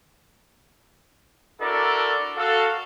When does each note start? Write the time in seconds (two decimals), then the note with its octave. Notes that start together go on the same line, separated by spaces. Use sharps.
1.61 D4 E4 F#4 A4 A#4 D5
2.37 F#4 A4 F5